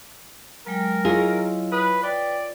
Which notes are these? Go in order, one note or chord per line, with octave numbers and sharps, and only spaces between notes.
F#3 G#3 A#4 G5
F#3 E4 F4 G#4 C#5 D#5
B4 D#6
B4 D5 G5